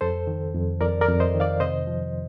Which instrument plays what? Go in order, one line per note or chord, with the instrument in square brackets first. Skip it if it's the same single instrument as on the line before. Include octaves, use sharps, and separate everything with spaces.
[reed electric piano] F2 A4 C5
D#3
F2
F2 A#4 D5
A#4 D5
F2
C5 D#5
D#3
D5 F5
C3 C5 D#5
F3